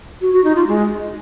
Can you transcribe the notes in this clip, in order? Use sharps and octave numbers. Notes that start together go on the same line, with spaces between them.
F#4
F#4
D#4
F4
G#3